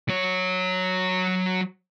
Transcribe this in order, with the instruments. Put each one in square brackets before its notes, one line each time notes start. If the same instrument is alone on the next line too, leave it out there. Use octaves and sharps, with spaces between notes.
[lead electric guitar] F#3 C#5